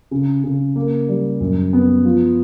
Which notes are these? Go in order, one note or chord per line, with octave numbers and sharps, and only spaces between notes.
C#3
C#3
A#3
G3
F#2
B3
F3